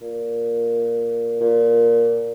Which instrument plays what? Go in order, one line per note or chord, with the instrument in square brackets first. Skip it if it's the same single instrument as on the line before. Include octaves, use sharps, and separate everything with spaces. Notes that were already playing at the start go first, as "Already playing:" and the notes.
[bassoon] A#2
A#2